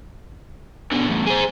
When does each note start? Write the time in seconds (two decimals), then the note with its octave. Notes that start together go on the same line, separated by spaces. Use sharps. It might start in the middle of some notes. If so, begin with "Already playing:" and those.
0.92 B2 D3
1.09 E2 A2
1.27 G#4 C5